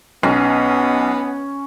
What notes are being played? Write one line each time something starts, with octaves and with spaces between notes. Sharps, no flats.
B1 B3 C#4